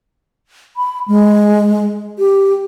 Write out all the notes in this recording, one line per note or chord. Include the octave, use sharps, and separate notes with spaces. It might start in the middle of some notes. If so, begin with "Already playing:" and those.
B5
G#3
G4